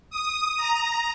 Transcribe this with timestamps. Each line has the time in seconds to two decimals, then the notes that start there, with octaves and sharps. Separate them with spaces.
0.10 D#6
0.57 A#5